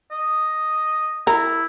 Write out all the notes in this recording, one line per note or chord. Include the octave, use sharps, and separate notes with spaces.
D#5
E4 A#4